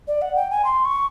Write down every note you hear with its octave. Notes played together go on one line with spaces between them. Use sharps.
D5
F#5
G5
G#5
C6
C#6